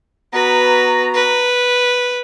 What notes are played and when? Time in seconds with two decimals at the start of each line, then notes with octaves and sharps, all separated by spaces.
0.33 B3 F#4 B4 A#5
1.14 B4